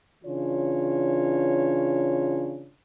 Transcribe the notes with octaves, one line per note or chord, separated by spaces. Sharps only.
C#3 E3 D4 F4 C#5